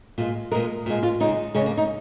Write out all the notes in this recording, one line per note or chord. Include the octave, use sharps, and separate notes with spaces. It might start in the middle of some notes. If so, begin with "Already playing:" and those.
A#2 G#3 F4
A#2 G#3 A#4
A#2 G#3
F4
C#3 G#3 D#4
C#3 G#3 C#4
A#3
D#4